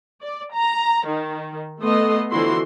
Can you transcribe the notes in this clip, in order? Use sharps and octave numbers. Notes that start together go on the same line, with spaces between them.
D5
A#5
D#3
A3 B3 A4 D#5 C6
D3 E3 F3 E4 F#4 C6